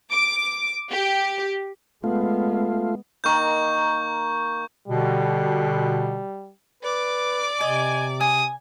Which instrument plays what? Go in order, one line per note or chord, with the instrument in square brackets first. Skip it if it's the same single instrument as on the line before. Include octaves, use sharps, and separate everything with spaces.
[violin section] D6
G4
[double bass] G#3 B3 [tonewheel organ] A3 F4
[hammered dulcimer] D#3 A#3 A#5 [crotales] C#6 G6
[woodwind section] B2 D3 [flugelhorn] G3
[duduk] B4 [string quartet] D5 D6
[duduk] C3 [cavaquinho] D#5 [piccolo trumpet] G#5
[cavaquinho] G#5 [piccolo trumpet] D#6